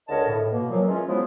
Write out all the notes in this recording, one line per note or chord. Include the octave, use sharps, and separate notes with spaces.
C#2 D3 A#4 C#5 D#5 A5
A2
B2 A#3
A#2 F3 F#3
E3 G#3 C#4 F4
F3 F#3 G#3 B3 E4